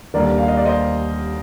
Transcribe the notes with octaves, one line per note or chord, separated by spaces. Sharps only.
D#2 D3 G3 A#3 A#4 D5
F5
D#5
D5
C5 D#5